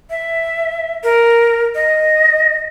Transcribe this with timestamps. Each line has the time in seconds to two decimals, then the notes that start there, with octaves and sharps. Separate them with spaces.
0.10 E5
1.03 A#4
1.75 D#5